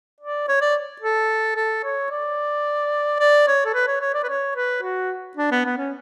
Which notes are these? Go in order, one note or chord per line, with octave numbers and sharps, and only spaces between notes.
D5
C#5
D5
A4
A4
C#5
D5
D5
C#5
A4
B4
C#5
C#5
D5
B4
C#5
B4
F#4
D4
B3
B3
C#4